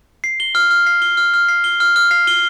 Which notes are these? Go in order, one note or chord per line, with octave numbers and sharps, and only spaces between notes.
C7
G7
F6
F6
C7
G7
F6
F6
C7
G7
F6
F6
C7
G7